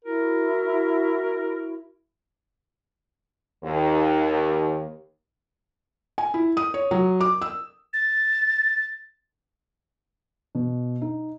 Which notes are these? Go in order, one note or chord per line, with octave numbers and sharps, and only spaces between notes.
E4 F#4 A#4
D#2
G#5
E4
D#6
C#5
F#3
D6
E6
A6
B2
D#4